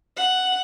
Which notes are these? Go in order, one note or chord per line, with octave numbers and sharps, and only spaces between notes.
F#5